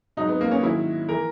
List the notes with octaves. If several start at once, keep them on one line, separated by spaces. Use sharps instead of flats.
G#2 F#3 D#4
B3
A#3
C#4
G#2 D#3 F#3 E4
E3 A#4